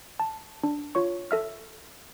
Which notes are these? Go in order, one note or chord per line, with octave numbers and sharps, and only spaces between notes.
A5
D4
F4 C#5 C#6
A4 E5 F6